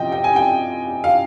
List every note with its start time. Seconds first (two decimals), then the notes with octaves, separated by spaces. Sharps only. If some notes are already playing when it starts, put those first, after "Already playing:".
Already playing: C3 F3 D#5 G5
0.12 G5
0.24 G#5
0.36 G5
1.04 F5